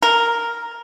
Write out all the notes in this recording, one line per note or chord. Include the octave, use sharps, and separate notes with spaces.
A#4